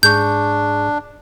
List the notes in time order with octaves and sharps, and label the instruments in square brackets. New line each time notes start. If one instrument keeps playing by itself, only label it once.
[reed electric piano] G#2 G#4 C#6 [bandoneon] D4 [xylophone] G6